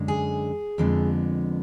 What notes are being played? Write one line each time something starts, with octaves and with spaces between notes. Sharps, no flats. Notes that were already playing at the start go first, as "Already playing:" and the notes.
Already playing: F#2 D3 G#3
G#4
F2 D3 F3 G#3 B3